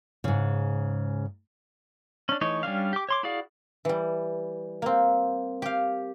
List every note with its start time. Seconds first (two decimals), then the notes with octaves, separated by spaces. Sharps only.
0.24 G#2 C#3
2.29 C#4 D4
2.41 E3 A3 D#4 C#5
2.63 G3 C#4 D4 F5
2.93 G4 D6
3.09 C#5 C6 D6
3.23 E4 F#4 G#4 D5 F5
3.85 E3 G3
4.82 A#3 C4
5.62 G4 F5